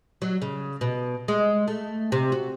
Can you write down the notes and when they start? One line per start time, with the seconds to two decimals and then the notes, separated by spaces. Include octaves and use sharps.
0.22 F#3
0.42 C#3
0.81 B2
1.28 G#3
1.68 A3
2.12 C3
2.32 F#4